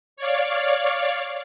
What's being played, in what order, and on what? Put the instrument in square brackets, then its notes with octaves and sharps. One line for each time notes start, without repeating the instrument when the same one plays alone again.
[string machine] C#5 D5 F5